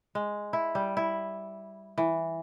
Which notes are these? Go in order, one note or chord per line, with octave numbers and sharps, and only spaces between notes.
G#3
E4
G3
E4
E3